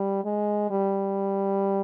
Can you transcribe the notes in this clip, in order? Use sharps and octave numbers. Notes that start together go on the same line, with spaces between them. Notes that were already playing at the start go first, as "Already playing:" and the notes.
Already playing: G3
G#3
G3